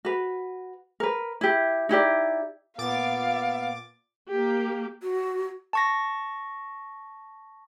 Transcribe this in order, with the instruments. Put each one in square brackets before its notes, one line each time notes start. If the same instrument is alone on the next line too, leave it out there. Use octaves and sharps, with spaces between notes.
[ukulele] F#4 B4
A#4 B4
E4 G4
D#4 E4 G4 D5
[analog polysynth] A#2 D6 A6 [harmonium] B3 [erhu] F5
[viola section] A#3 G4
[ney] F#4
[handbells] A5 C#6 A#6